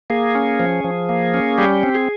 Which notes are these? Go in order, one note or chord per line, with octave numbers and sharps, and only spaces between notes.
A#3 G#4
C#4
F3
F3
A#3
C#4
G3 G4
C4
G#4